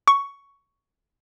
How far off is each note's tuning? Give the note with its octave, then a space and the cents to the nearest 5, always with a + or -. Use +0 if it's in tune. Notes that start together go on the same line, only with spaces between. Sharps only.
C#6 +10